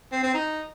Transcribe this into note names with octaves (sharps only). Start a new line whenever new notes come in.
C4
C4
D#4